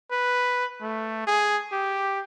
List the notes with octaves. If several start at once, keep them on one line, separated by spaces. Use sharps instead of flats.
B4
A3
G#4
G4